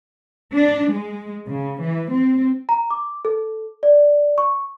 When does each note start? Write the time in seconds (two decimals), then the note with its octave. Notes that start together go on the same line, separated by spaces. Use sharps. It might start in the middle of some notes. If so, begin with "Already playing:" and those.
0.55 D4
0.93 G#3
1.48 C#3
1.81 E3
2.11 C4
2.69 A#5
2.90 D6
3.25 A4
3.83 D5
4.38 C#6